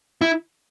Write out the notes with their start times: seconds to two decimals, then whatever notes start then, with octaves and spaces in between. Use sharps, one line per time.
0.21 E4